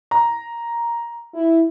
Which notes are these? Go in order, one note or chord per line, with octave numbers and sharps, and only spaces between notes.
A#5
E4